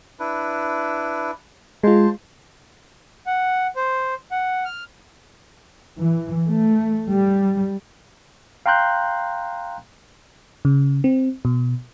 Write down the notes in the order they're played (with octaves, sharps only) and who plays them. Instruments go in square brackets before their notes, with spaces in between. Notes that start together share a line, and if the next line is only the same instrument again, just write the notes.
[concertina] D4 E4 B4
[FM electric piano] G#3 F4 [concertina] C5 A5
[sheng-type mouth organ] F#5
C5
F#5
F6
[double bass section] E3
A3
G3
[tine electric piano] F5 G5 A#5 C6 F#6 G6
[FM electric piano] C#3
C4
B2